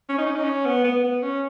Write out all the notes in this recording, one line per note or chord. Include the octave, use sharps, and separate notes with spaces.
C#4
D#4
C#4
D#4
C#4
B3
B3
B3
C#4